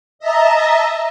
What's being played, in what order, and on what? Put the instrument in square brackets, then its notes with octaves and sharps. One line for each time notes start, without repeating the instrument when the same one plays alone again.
[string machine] D#5 E5 A5 A#5